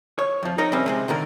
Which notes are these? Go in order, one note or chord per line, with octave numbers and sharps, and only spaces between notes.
C#5
F2 F3
D#4 A#4 C#5 D#5
C3 G3 C4 C#4
C3 G#3 C4
A#2 D3 D#3 A#4